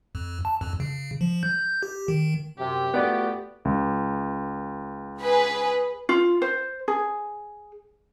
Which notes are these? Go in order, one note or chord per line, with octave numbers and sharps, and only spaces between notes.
F2
A5
F2
C#3
F3
G6
G4
D#3
F#2 C3 G4
A3 B3 F4 F#4 D5
C#2
G#4 B4
F4
C5
G#4